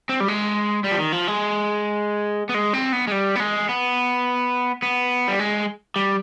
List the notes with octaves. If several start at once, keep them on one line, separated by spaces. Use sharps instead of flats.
C4
G3
G#3
G3
F3
D#3
F3
G#3
B3
G#3
C4
B3
G#3
G3
B3
G#3
B3
B3
G3
G#3
G3